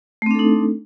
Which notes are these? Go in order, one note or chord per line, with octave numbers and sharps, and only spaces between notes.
A3 C4 D4 D#4 A4